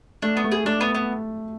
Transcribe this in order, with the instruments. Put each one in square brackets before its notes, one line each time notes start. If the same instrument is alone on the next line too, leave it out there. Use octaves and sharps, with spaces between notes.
[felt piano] A3 [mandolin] D4
[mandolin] B3
[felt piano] A3
[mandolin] G#4
[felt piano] A3 [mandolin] D4
[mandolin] B3
B3